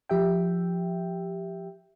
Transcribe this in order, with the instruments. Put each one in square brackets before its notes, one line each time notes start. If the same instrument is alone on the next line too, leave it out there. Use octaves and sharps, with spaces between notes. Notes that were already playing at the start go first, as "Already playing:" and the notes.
[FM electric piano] F3 G4 E5 G5